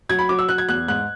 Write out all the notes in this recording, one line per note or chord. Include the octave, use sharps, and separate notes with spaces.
F#3 G#6
B5
F#3 D6
E6
F#3 F#6
G#6
E2 F#6
G#2 F#6